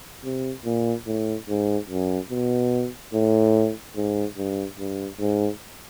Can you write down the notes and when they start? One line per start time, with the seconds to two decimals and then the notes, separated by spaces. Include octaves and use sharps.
0.24 C3
0.65 A#2
1.07 A2
1.49 G#2
1.90 F#2
2.30 B2
3.14 A2
3.96 G#2
4.37 G2
4.79 G2
5.20 G#2